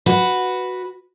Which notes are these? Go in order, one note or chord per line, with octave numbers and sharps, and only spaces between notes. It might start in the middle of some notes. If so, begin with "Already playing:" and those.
F#4 B4